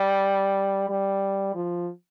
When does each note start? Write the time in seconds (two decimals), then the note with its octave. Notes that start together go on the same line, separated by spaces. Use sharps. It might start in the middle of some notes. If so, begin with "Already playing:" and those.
Already playing: G3
0.89 G3
1.55 F3